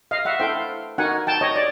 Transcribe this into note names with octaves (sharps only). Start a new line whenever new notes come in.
D#5 F5
E5 F#5
E4 A4 C5 F5 G5
D#4 F#4 A#4 F#5 G#5
G5 A5
C#5 D#5
D5